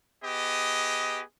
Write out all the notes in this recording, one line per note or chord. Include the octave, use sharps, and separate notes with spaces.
B3 G4 G#4 D#5